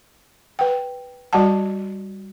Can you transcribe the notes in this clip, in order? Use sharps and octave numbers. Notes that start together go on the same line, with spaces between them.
B4 F#5 G5
G3 F#4 D5 F#5 A5